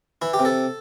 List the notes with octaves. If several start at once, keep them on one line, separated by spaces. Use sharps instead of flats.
E3 E4
G4
C3
A4